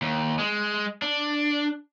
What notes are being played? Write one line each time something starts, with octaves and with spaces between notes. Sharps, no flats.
D#2
G#3
D4